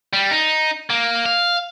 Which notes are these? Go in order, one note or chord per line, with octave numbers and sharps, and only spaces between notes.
G3
D#4
A#3
F5